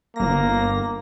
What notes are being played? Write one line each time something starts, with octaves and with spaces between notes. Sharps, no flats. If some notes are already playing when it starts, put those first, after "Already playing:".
G1 A#3 A#6